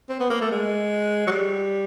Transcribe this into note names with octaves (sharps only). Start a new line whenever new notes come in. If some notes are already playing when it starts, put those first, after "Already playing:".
C4
B3
A#3
A3
G#3
F#3
G3